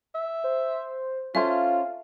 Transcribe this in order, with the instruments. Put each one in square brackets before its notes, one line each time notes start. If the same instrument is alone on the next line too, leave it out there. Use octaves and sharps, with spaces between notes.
[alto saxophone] E5
[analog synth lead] C5
[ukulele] C#4 A4 C5 [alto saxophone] F4 [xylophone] E5 [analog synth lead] F5